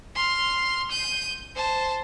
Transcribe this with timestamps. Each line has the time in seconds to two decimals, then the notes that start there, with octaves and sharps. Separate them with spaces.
0.16 C6 F6
0.91 G6 D#7
1.56 C5 A5